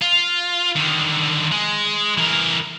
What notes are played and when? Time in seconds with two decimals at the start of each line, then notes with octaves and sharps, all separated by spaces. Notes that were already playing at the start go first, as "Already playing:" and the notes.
0.02 F4
0.76 D3 D#3
1.51 G#3
2.18 E3 A#4